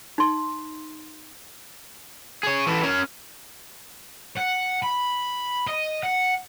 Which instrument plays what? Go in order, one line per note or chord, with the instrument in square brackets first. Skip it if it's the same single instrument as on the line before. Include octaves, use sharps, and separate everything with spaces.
[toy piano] D#4 C6
[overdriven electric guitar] G#4 C#5
E3 A4
C#4 A#4
[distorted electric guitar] F#5
B5
D#5
F#5